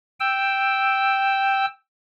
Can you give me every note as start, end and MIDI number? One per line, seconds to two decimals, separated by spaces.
0.20 1.66 79
0.20 1.66 88